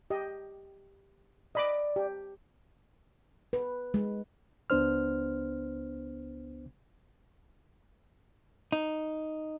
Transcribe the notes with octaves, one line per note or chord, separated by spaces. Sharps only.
G4 D#5
D5 D#5 B5 D6
G4
B4
G#3
C#2 B3 D4 C5 F6
D#4